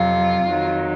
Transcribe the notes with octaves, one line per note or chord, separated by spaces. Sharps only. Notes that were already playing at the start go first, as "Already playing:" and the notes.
Already playing: F2 C3 F#3 F4
F2 D#3 F#3